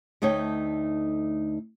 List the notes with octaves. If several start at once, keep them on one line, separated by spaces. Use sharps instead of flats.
D2 A3 D#4 C#5 G5